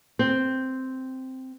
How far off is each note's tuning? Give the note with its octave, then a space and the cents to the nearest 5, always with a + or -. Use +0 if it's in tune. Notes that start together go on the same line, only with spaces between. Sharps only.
C4 -5